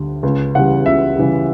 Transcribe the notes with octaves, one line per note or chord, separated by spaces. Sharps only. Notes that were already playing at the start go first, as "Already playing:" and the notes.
Already playing: D2 D3 G3
C#2
C#3 E3 G3 F#5
C#2 E5
C#3 E3 G3